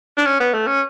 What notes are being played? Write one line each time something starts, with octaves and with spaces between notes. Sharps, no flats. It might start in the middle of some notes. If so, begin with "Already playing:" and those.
D4
C#4
B3
A3
C#4